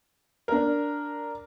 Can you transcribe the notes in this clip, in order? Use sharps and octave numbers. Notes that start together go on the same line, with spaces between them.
D4 A#4